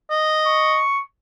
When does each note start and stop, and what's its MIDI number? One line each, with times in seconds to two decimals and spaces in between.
0.10 0.81 75
0.47 1.04 85